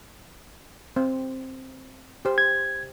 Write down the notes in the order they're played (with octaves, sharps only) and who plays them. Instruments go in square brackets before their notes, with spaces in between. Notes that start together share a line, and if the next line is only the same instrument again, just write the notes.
[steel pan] C4 C5
G4 C5
[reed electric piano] G#6